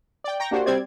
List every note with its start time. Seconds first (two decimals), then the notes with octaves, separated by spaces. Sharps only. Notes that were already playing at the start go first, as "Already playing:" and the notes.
0.24 D5 G5
0.40 G5 A#5 C#6 A#6
0.51 A#3 D4 F#4 G4 C5
0.66 G3 C4 C5 D5 G#6